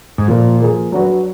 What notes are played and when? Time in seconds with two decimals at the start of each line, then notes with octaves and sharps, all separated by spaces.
0.18 G#2
0.28 A#2 F3 A#3 F4
0.60 F3 A#3 F4 G#4
0.92 F#3 D4 F#4 B4